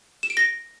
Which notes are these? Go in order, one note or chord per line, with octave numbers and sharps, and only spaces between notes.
E7
D7
A#6